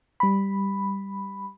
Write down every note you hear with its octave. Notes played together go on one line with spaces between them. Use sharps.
G3 B5